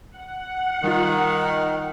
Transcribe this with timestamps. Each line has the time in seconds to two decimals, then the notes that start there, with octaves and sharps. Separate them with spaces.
0.16 F#5
0.84 D#3 G3 F4